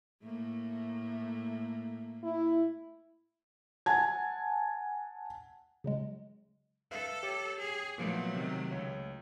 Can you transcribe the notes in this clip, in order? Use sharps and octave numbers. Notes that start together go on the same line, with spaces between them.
A2 A3 A#3
E4
F#5 G#5 A5 G#6
C#3 F#3 G#3
A4 B4 E5 F5
G4 C#5 D6
G#4
A#2 F3 F#3 A3 B3
C3 D#3
C#2 C#5